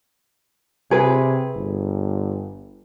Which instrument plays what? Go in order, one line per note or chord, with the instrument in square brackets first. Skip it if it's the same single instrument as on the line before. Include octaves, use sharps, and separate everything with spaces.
[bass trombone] C3 [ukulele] G#4 B4
[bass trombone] G1